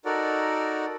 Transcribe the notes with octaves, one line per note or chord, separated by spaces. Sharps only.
D#4 F#4 A4 A#4 D5 F#5